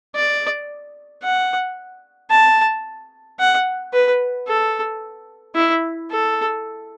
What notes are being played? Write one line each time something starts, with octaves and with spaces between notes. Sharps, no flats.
D5
F#5
A5
F#5
B4
A4
E4
A4